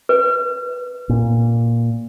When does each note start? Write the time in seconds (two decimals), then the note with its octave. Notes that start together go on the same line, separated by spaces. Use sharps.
0.09 B4
1.09 A#2